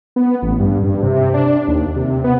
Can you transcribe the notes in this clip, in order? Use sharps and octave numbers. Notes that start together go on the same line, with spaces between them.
B3
A1
G2
G2
C3
D4
D#2
C3
B3